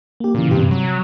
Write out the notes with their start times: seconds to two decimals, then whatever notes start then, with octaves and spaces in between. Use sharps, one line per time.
0.20 A#3 G4
0.35 A#2 C#3 E3
0.51 G2 C3 G4
0.71 F#3